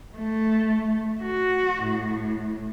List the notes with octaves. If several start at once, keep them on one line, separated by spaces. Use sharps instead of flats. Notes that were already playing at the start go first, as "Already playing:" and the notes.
A3
F#4
A2